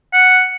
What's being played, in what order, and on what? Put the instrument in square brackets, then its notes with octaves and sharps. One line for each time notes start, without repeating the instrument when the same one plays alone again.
[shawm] F#5